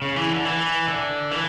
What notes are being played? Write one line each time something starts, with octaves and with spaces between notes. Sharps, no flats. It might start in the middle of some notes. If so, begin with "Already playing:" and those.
C#3
E3
D3
E3
D3
E3